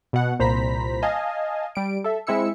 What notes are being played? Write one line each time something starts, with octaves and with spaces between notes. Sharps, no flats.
B2 F#5
C2 A#2 C5 A#5 B5 B6
D#5 F5 G#5 A5
G3 D7
A4 E5
G#3 C4 E4 E5 E6 C#7